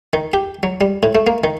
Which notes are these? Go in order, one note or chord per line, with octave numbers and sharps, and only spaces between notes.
D#3
G4
F#3
G3
A2
A3
A#3
D#3